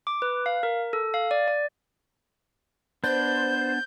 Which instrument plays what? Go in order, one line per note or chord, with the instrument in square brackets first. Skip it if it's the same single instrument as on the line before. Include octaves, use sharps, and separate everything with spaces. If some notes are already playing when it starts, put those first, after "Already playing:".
[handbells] D6
B4
F5
A#4
A4
F5
D5
D5
[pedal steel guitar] B3 D4 [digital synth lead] C5 [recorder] G6